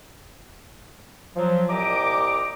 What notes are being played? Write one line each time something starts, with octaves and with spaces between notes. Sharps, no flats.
F3 F#3
C2 A#2 G4 D#5 A#5 D6